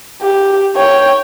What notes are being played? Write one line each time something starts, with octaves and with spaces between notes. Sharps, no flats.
G4
C#5 G5